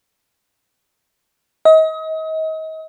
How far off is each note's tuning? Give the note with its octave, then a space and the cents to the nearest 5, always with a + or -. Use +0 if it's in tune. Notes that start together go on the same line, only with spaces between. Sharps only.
D#5 +35